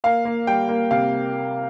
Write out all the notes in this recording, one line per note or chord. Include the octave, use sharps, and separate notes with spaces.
A#3 F5
A#3
G3 G5
A#3
C3 F5